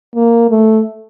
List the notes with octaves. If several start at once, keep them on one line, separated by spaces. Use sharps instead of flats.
A#3
A3